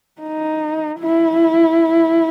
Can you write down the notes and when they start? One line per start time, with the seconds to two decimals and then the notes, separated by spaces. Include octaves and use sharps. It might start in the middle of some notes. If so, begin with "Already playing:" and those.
0.21 D#4
0.99 E4